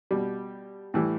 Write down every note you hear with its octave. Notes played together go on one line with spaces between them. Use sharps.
B2 G3
A2 E3 G3